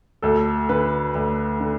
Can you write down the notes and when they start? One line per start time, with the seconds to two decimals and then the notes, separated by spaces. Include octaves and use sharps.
0.22 D2 A4
0.69 D3 B4
1.15 D2
1.60 D3